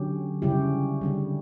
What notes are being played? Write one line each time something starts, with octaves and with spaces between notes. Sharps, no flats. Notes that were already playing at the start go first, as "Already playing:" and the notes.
Already playing: D3 F#3 C#4 G4
C#3 G3 C#4 E4 G4
D3 G3 C#4